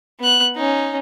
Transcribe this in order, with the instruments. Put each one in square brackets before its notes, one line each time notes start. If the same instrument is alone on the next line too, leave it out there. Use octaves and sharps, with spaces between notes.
[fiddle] B3 F#6
C#4 D#4